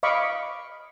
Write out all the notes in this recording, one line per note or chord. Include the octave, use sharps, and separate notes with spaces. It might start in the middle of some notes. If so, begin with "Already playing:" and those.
D#5 F5 B5 C#6 D6